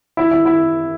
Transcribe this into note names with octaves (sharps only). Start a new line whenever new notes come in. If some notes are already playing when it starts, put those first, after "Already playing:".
E4
E4
E4